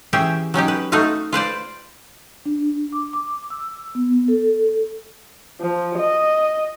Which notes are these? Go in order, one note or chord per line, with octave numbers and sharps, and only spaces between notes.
E3 C#4 G4 G#4 E5 G5
F#3 C#4 D#4 G4
B4
A3 D#4 F#4 B4 F5
F4 B4 C5 D5
D4
D6
D6
E6
B3
A4
F3
D#5